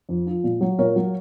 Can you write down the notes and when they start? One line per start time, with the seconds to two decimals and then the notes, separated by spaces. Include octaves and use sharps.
0.09 F2
0.27 F3
0.44 A#2
0.61 F#3
0.79 A#2 A#4 C#5
0.96 F#3